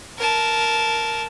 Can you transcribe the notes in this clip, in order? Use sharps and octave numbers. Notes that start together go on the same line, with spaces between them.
A#4 A5